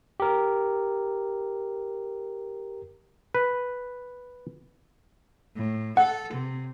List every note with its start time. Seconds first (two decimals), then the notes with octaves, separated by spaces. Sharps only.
0.20 G4 A#4
3.35 B4
5.56 A2
5.97 A4 F#5
6.33 C3